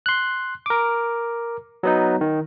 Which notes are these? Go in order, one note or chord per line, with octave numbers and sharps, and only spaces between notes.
C6 F#6
A#4 D6
F#3 B3 D#4
D#3